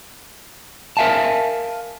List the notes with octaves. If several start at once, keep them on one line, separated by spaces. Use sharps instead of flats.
A#4 E5 F5 G#5 A5